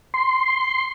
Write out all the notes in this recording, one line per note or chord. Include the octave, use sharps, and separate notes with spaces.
C6